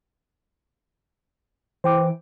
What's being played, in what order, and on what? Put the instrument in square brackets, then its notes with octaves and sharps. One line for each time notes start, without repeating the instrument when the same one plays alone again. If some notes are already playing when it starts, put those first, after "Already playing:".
[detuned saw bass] E3 [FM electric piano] C5 G5 D6